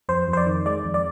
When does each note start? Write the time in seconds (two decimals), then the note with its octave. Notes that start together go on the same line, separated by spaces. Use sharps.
0.09 F2 C5
0.28 F2
0.33 C5
0.37 D5
0.46 D#3
0.66 G#3 D5
0.84 F2
0.94 D5